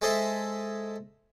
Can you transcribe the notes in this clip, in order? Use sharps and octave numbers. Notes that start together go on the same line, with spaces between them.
G#3 G#4 A4 C5 D#5 E5